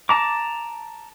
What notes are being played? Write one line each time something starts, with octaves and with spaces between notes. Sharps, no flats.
A5 A#5 D6